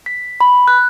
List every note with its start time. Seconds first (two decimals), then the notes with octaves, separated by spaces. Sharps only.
0.06 B6
0.41 B5
0.68 F#6